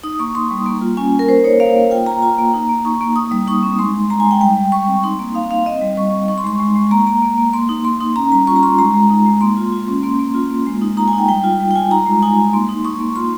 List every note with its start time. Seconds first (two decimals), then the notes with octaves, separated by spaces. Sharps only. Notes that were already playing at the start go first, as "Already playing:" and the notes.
0.04 D#4 D#6
0.19 A#3 C#6
0.35 A#3 C6
0.51 G3
0.66 A#3
0.81 F4
0.97 C#4 G#5
1.12 A#3
1.19 A#4
1.28 A#3 C5
1.44 D#4 C#5
1.60 A#3 F5
1.75 A#3
1.91 F4 G5
2.06 F4 A#5
2.22 F4 A#5
2.38 A#3
2.54 D#4
2.69 A#3
2.85 D#4 C#6
3.01 A#3
3.16 D#4 D#6
3.31 G3 D#6
3.47 D#4 C#6
3.63 C4
3.79 G#3 C6
3.94 D#4
4.10 G#3 A#5
4.20 G#5
4.25 G#3
4.31 G5
4.41 G3 G5
4.57 G3
4.72 G3 C#6
4.88 C4
5.03 D#4 C6
5.19 A#3
5.34 D#4 F5
5.50 D#4 F5
5.66 C4 D#5
5.81 G3
5.97 G3 C#6
6.13 G3
6.28 D#4 C#6
6.38 C6
6.44 G#3 C#6
6.60 G#3
6.75 G#3
6.91 A#3 A#5
7.07 A#3 A#5
7.22 A#3
7.38 A#3
7.53 A#3 C6
7.69 D#4
7.84 A#3 C6
8.00 D#4 C6
8.16 C#4 A#5
8.32 G3 A#5
8.47 F4 C#6
8.56 A#5
8.63 F4 C6
8.78 G#3 A#5
8.94 G#3
9.10 D#4
9.26 G#3
9.41 A#3 C6
9.57 F4
9.72 F4
9.88 C#4
10.03 A#3 C6
10.19 A#3
10.35 F4
10.51 A#3
10.66 G#3
10.82 D#4
10.97 D#4 A#5
11.08 G#5
11.13 D#4
11.18 G5
11.28 G3 G5
11.44 F4
11.60 G3
11.71 G5
11.76 F4 G#5
11.91 D#4 A#5
12.06 G#3
12.22 D#4 G#5
12.38 D#4
12.53 A#3 C6
12.69 D#4
12.85 D#4 C#6
13.00 A#3
13.16 F4 C6